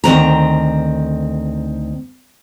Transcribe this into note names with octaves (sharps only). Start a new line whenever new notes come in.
D2 D#3 C4 A#5